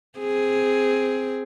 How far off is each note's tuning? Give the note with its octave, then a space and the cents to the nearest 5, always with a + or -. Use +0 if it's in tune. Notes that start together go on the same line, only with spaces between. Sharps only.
C4 +0 G#4 +0